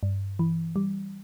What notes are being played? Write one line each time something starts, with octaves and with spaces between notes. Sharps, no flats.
G2
E3
G3